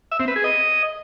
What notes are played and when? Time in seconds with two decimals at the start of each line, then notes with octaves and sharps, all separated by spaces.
0.12 E5
0.20 C4
0.28 B4
0.36 G#4
0.44 D#5